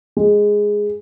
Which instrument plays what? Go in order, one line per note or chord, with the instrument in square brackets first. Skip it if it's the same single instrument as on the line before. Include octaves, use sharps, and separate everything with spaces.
[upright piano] G#3